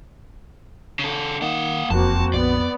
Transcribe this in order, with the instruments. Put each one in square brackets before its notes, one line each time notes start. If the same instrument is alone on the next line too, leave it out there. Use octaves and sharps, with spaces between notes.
[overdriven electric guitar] C#3 A4
[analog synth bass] D#3 [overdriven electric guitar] A#3 F#5
[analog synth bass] E1 [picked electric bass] F2 [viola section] A#3 C4 F#4 [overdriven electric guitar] A5
[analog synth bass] A#1 [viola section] B3 [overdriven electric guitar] D5